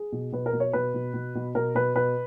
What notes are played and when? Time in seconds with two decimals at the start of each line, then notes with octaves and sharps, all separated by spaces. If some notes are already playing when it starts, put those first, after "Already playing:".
Already playing: G#4
0.12 B2
0.33 B2 B4
0.46 A#4
0.53 B2
0.60 C#5
0.73 B2 B4
0.94 B2
1.14 B2
1.35 B2
1.55 B2 A#4
1.75 B2 B4
1.95 B2 B4